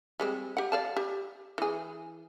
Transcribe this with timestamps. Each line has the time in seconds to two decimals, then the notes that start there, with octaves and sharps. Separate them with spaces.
0.20 G3 G#3 C4
0.57 G4 F#5
0.72 D5 F5 A5
0.97 G4
1.58 E3 G#4